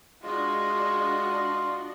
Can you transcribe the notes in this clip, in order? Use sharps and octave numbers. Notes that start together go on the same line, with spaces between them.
G#3 D4 F4 F#4 D#5